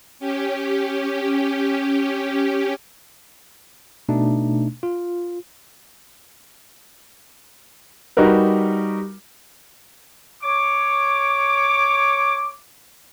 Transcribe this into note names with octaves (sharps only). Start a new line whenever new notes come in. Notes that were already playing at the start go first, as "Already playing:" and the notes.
C#4 G4
B2 A3 D4 D#4
F4
G3 D#4 F#4 G4 A#4 B4
C#5 D6